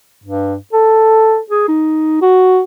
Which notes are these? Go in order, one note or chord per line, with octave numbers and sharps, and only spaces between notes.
G2
A4
G#4
D#4
F#4